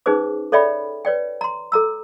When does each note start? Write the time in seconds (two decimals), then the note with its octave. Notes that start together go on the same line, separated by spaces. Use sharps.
0.06 C#4 D#4 G#4 B4 C5 D6
0.52 A4 C#5 D5 E5 G5 B5
1.05 B4 C#5 D5 G5
1.41 A#5 C6
1.72 A4 A#5 E6